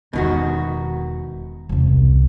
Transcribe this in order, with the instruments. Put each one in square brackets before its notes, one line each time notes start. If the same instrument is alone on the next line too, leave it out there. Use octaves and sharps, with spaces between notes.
[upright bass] E1 [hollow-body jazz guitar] B2 D#3 F#4
[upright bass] E1 C2